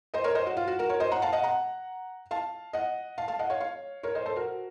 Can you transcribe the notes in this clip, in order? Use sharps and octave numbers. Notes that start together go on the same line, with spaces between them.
C5 D#5
A#4 C#5
C5 D#5
F#4
F4
F#4
F#4 A#4
A#4 C#5
C5 D#5
F#5 A#5
F5 A5
D#5 F#5
F#5 A#5
F5 A5
D#5 F#5
F5 A5
F5 A5
D#5 F#5
C#5 F5
C#5 F5
A#4 C#5
C5 D#5
A4 C5
F#4 A#4